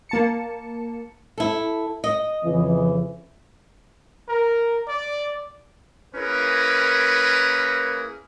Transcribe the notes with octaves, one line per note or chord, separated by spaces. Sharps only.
A#3 A5 C#7
E4 A4
D#5
F2 C#3 E3
A#4
D5
A#3 C#4 E4 G#4 A#4 B4